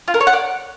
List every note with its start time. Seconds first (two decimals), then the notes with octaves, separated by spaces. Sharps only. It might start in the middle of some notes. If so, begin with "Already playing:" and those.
0.08 F4
0.14 A#4
0.20 C#5
0.27 F#5
0.33 D5